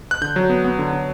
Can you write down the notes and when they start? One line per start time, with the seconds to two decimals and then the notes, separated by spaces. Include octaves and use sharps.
0.11 F#6
0.21 D3 G6
0.36 F#3
0.50 B3
0.64 B3
0.79 D3
0.93 D3